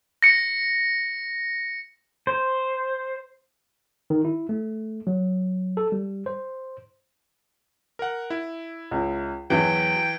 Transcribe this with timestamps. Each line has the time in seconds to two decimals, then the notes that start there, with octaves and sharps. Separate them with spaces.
0.23 A#6 C#7
2.27 C5
4.10 D#3
4.25 E4
4.49 A3
5.07 F#3
5.77 A4
5.92 G3
6.26 C5
7.99 A#4 F#5
8.30 E4
8.91 C#2
9.50 E2 E3 F#3 G5